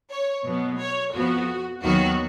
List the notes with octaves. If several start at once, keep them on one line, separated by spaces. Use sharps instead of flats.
C#5
B2 F#3 B3
C#5
F2 F3 B3 F#4
D#2 D#3 F#3 B3 F#4